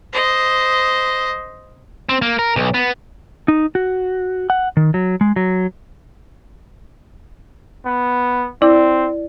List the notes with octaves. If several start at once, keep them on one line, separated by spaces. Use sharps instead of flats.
C5 D#5
C4
A#3
A#4
B1
B3
D#4
F#4
F#5
D#3
F#3
G#3
F#3
B3
C4 E4 D5